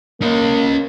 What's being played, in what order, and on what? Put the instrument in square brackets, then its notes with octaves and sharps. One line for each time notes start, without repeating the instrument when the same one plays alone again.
[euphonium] A#3 [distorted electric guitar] C#4 D#5